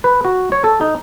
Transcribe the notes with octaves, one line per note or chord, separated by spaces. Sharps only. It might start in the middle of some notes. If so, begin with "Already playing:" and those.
B4
F#4
C#5
A4
D#4